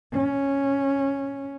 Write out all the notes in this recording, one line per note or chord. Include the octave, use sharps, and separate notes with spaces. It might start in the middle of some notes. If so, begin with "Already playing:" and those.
C#4